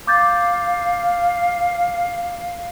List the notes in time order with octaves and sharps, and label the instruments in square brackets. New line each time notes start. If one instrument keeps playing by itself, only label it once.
[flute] F5 [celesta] D6 G6 A6